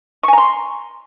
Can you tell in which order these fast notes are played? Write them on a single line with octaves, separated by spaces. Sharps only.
C#6 G#5 A#5 C6